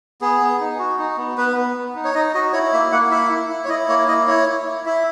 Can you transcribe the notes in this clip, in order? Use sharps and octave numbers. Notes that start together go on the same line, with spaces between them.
B3 G#4
B3
D#4
F#4
D#4
B3
B3 B4
B3
B3
D#4
C#5
D#4 D#5
F#4 D#5
E4 C#5
A#3 E5
A#3 F#5
E4 E5
E4
E4
C#5
E4 D#5
A#3 C#5
E4 D#5
E4 C#5
E4
E4
E4 E5